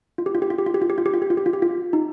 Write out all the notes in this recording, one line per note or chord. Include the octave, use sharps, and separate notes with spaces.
F4
G4
F4
G4
F4
G4
F4
G4
F4
G4
F4
G4
F4
G4
F4
G4
F4
G4
F4
D#4